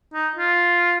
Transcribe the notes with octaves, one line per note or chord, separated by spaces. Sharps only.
D#4
F4